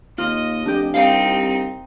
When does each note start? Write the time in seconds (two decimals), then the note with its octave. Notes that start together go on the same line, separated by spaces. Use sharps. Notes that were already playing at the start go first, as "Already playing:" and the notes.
0.18 D#2 F4 D#5
0.66 F1 D4 G4
0.94 C2 C4 D#4 F5 G5